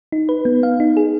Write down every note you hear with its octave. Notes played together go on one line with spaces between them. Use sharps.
D#4
B4
B3
F5
D#4
G#4